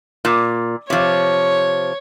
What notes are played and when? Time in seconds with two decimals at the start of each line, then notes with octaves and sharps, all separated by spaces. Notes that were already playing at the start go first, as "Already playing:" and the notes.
0.25 A#2
0.90 C3 F3 C#5